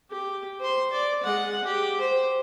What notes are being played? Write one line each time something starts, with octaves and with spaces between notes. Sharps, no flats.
G4
C5 C6
D5
G#3 F#5
G4
C5